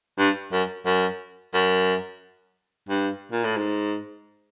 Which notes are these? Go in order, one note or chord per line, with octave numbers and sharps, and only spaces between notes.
G2
F#2
F#2
F#2
G2
A#2
A2
G#2